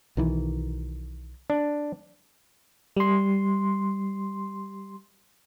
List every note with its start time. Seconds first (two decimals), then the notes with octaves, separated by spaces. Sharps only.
0.17 B1 D#3 E3
1.50 D4
2.97 G3 C6